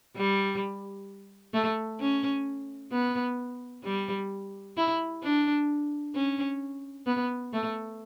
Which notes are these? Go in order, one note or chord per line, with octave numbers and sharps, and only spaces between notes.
G3
A3
C#4
B3
G3
E4
D4
C#4
B3
A3